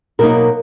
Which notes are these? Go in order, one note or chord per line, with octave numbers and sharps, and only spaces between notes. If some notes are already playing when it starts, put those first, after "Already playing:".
B2 F#3 A#3 D#4 A#4